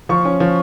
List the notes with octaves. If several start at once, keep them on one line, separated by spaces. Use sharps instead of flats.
F3 C#6
C#4
F3